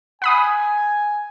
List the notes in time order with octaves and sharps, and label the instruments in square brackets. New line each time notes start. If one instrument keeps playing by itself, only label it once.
[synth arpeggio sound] F#5 B5 D#6 [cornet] G#5